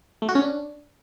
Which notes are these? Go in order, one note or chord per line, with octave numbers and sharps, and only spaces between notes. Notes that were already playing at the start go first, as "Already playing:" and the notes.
A3
F#4
C#4
D4